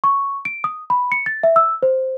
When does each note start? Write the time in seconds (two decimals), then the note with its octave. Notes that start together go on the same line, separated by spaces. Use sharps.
0.04 C#6
0.45 D7
0.64 D#6
0.90 B5
1.12 C#7
1.26 A6
1.43 E5
1.56 E6
1.83 C5